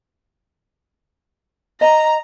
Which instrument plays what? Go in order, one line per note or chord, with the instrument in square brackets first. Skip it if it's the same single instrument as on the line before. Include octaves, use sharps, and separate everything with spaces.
[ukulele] D#5 [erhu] A#5